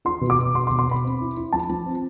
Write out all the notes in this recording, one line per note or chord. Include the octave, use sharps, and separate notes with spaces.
F4 C6
B2
D6
B2
B2 C6
C6
B2
C6
B2 B5
C4
E4
E4
F3 A5
F3
C4